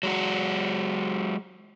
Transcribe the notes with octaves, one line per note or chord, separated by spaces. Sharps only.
F#3 G#3 F#4